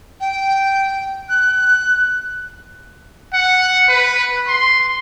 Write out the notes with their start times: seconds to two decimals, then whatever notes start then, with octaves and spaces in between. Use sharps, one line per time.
0.20 G5
1.29 F#6
3.33 F#5
3.88 B4
4.47 C6